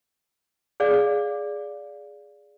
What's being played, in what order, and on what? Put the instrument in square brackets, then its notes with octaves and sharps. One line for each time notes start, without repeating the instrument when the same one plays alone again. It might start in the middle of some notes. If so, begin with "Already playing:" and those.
[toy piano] G#4 D5 F5